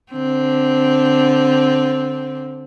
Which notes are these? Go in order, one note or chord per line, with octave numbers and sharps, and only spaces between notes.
D3 C4